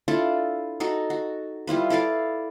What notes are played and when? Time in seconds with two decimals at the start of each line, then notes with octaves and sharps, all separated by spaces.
0.08 D4 E4 F4 A4
0.80 D#4 F#4 A4
1.10 F#4
1.67 G3 E4 F4 B4
1.90 E4 A4 D5 F5